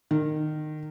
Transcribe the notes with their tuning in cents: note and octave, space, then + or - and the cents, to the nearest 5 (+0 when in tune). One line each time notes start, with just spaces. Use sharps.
D#3 -25